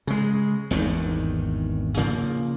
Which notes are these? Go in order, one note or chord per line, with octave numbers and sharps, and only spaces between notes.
C#3 G#3
G#1 E2 G2 D#3
C#3 F3 A#3